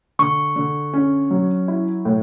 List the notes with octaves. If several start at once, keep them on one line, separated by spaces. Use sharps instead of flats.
D3 C#6
D3
C#4
F#3
E4
A2